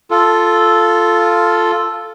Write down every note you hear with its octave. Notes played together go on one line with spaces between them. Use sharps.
F4 A4